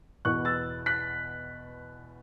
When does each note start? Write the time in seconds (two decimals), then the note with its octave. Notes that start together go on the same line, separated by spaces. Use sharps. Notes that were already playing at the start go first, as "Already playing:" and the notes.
0.25 E2 B2 B3 C#6 F#6
0.45 E6 A6
0.86 F#6 B6